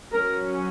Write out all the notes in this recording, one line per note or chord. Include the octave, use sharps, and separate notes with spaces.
F#3 C#4 A#4